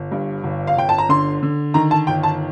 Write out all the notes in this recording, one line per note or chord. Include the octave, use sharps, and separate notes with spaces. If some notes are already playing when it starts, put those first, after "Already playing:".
Already playing: G1
G2
G1
F5
G1 G5
A5
A#5
D3 C6
D3
D#3 A#5
A5
G1 G5
A5